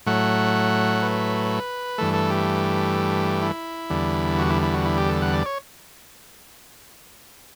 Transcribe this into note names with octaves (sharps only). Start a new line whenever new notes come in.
A2 F#3 A3 F#5
B4
G2 E3 A3 A4
A4
G4
E4
E2 D3 G3
F#4
E4
E4
F#4
E4
G4
A4
F#5
D5
C#5